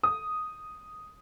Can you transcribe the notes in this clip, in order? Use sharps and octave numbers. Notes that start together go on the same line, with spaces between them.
D#6